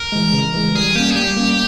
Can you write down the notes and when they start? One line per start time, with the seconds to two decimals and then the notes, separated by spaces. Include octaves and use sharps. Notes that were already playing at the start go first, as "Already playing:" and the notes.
Already playing: A#4
0.12 E3 G#3
0.33 C#3
0.54 E3 G#3
0.75 G3 G#4
0.95 A#3 C#4 G4
1.10 G#4
1.16 G3 G4
1.37 A#3 C#4